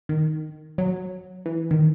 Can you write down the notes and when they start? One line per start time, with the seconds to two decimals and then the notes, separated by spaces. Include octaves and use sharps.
0.09 D#3
0.78 F#3
1.46 E3
1.71 D#3